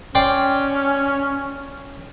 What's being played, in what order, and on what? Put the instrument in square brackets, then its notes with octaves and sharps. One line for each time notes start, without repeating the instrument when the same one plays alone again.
[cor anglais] C#4 [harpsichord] D5 G5 C6